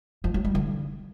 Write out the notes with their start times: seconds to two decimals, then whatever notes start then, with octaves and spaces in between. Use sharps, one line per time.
0.24 F3
0.34 F#3
0.45 G3
0.55 D3